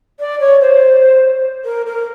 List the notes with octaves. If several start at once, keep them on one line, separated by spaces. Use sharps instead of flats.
D5
C#5
C5
A#4
A#4